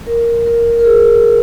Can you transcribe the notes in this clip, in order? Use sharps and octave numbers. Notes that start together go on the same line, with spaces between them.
A#4
A#4
A#4
G#4